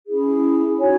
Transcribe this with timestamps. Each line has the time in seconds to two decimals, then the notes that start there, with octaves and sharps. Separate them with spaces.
0.07 C#4 E4 G#4
0.77 D#4 F#4 C#5 G#5